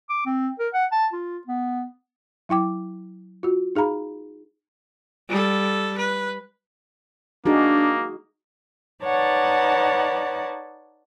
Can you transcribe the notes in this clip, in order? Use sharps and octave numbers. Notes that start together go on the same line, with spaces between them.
D6
C4
A#4
F#5
A5
F4
B3
F#3 E4 G5 D6
F4 F#4
D#4 G#4 F5 A#5 B5
G3 A4
B4
A#3 D4 D#4 F#4 G#4
D#4 B4 C#5 D5 F#5 A5